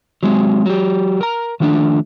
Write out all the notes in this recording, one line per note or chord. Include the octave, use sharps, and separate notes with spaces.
F#3 G#3 B3 C4
F#3 G4
A#4 A#5
D#3 F3 A3 D4